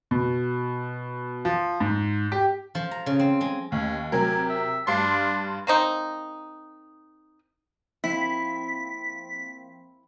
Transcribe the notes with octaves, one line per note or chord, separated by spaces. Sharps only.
B2
F3
G#2
G4
F3
A#5
C#3
C4
G#3
D#2 C#4
C3 F#3 A#4 G#5
E5
G2 D4 F5 C6
A#3 C4 D#4
F3 A#3 C4 E4 B6